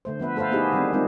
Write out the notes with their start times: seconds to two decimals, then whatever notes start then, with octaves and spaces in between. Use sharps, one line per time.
0.05 D3 A3 C5
0.20 F3 B3 B4 E5
0.36 A3 A4 B4 C5 F5
0.51 A#3 B3 D#4 E4 G4 G#4
0.72 D#3 G3 C4
0.93 G3 G#3 A#3 C4 D#4 F4